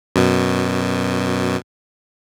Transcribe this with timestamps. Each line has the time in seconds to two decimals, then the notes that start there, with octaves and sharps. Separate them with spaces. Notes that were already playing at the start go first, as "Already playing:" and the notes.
0.16 F#2 B2